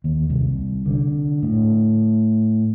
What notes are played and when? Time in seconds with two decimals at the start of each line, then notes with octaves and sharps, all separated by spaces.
0.04 D#2
0.30 C2
0.86 D3
1.42 A2